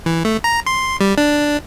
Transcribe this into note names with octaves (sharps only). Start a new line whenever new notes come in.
E3
A3
A#5
C6
G3
D4